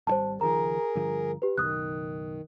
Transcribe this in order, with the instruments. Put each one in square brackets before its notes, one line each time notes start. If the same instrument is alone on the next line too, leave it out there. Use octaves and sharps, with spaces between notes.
[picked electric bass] G#1 C#3 G3 [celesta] C5 A5
[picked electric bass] C#2 D#3 F3 [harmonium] G#4 A#4 [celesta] A#5
[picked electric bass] G2 D3 F3
[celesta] G4 B4
[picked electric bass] F#1 B1 [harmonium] D#3 [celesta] D#6 F#6